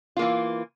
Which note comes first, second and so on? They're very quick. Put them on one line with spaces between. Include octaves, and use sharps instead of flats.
F4 A#3 E3